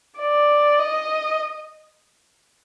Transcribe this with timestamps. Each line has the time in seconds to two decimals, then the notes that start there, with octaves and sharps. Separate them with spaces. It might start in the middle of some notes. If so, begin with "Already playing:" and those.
0.20 D5
0.79 D#5